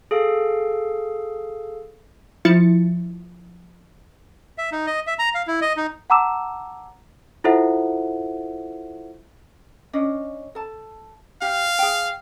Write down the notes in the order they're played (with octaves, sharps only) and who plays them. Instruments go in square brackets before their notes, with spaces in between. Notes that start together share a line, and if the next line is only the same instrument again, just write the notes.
[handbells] G#4 A4 F5
[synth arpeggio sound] F3 E4 A6 C#7
[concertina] E5
D#4
D#5
E5
A#5
F5
E4
D#5
D#4
[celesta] F#5 A5 A#5 D6 E6 E7
E4 F4 A4 C5 E5 F#5
[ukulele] C#4 D4 D#5
A4 A5
[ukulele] G4 [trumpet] F5
[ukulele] G#4 G5